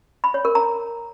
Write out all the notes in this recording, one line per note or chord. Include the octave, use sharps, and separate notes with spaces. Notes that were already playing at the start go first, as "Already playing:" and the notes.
B5
C#5
A#4
A#5